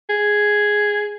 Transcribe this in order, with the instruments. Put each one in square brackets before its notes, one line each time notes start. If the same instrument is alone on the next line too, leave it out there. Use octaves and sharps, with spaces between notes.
[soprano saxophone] G#4